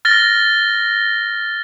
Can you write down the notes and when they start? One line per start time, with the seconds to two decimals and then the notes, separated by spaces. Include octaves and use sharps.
0.05 F6 A6 A#6 G7